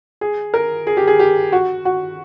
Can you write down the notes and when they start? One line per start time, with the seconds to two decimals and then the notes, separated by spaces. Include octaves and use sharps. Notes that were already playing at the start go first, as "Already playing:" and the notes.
0.21 G#4
0.54 A#4
0.87 G#4
0.97 G4
1.07 G#4
1.19 G4
1.52 F#4
1.85 F#4